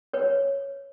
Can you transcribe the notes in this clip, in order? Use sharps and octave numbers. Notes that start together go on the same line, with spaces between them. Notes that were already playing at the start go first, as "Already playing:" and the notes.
B4 C#5